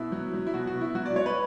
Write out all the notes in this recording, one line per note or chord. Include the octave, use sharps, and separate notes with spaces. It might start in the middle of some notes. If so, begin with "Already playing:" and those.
Already playing: B2 E4
F#3
F#3
E4
B2 F#4
F#4
B2
E4
F#3 F#4
D5
F#3 C#5
B4